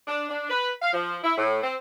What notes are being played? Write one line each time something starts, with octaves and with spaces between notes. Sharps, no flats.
D4
D4
B4
F5
F3
E4
A2
C4